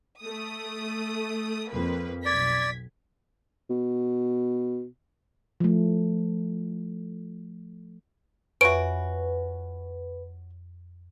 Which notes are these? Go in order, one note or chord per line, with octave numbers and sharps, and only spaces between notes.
A3 D#6
F2 A#3 B4
B1 D5 G#6 B6
B2
F3 A3
F2 C#4 F#4 B4 E5 D7